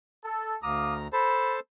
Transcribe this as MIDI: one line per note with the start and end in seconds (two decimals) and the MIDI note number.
0.24 0.56 69
0.63 1.08 38
0.63 0.94 77
0.63 1.08 82
0.63 0.94 86
0.63 0.94 87
1.13 1.60 69
1.13 1.60 72
1.13 1.60 81
1.13 1.56 83